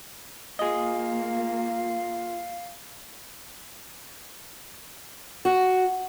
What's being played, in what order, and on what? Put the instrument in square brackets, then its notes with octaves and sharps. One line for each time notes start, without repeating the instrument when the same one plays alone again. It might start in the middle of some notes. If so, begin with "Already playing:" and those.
[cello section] A#3 [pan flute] F4 [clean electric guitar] G#4 D#5 [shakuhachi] F5
[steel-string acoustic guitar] F#4